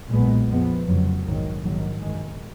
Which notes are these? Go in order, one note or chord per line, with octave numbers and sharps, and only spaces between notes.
B1 A#2 G#3 B3
F2 F3 G#3 B3
F1 F2 C#3 F#3
A#1 G#2 D#3 F#3
A#1 G#2 D#3 F#3
F#2 D#3 G#3